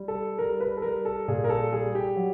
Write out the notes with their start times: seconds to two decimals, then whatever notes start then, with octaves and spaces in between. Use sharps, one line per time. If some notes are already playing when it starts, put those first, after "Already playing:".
Already playing: G3
0.08 A4
0.38 G3 A#4
0.60 B4
0.77 A4
0.82 G3 A#4
1.05 A4
1.28 A#2 G#4
1.44 A#4
1.49 A4
1.73 G3 G#4
1.95 G4
2.16 F#3